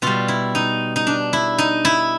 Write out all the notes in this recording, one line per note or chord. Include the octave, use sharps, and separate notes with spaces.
B2 G3 F4
E4
D#4
D#4
D4
E4
D#4
E4